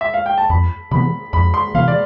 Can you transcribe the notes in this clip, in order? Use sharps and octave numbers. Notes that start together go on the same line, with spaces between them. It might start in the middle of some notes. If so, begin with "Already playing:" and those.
E5
F5
G5
A5
F2 B5
C3 E3 B3 B5
F2 B5
C6
C3 E3 B3 F5
D5